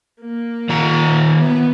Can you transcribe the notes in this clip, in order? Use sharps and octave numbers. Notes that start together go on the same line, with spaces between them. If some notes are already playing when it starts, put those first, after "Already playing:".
A#3
D#3 F4 A#5
B3